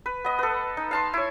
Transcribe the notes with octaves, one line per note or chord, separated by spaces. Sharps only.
B4
B3 D#5
A4 B4
D#4
F5 A5 C6
E4 C#5